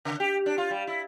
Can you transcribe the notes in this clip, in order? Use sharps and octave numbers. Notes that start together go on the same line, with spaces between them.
C#3
G4
D4
F4
G3
E4